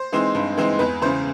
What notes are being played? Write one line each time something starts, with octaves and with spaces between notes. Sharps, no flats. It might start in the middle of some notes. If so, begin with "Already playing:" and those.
Already playing: C5
E3 G#3 C4 D#4
G2
E3 G#3 C4 D#4
E2 B4
C#3 E3 C5